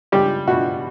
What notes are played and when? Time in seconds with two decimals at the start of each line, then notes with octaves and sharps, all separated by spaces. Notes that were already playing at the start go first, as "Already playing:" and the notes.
0.12 C#2 G3 G4
0.47 B2 F#4